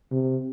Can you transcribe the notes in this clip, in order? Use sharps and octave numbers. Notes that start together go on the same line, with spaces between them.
C3